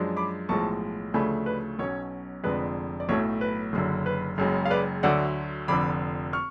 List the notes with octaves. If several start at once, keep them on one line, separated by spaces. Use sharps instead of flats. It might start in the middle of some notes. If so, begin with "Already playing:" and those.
Already playing: F#2 F3 G#3 D4
B5 D6
B1 A2 F3 G#3 A5 C#6
D2 C#3 F3 A3 D4 G#5 B5
B4 D5
B1 B2 F#3 C#4 C#5
F1 F2 D3 G#3 D4 B4
D5
B1 A2 F#3 A3 C#5
B4
F#1 F#2 D3
B4
F#1 F#2 C#3 G#3
F5
B4 D5
D2 D3 F#3 A3 D5 F#5
F1 F2 D3 B5 D6
C#6 F6